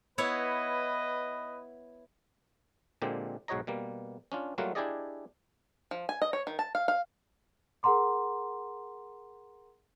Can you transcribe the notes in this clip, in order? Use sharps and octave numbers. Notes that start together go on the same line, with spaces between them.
B3 E4 B4 C#5 D#5
A#2 D3 G#3 A#3 C4 G4
B1 G#2 F#4 C#5 D#5 A#5
B2 G3 A#3
C#4 D4 F4
F#3 G3 A3 A#3 F4 F#4
D4 E4 G4 G#4 D5 D#5
F3
G#5
D#5
C#5
D#3
A5
F5
F5
G#4 A#4 F#5 A#5 C6 D6